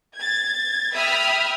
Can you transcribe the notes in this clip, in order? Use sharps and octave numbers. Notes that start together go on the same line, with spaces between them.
G#6 A6
E5 G5 B5 D#6 F6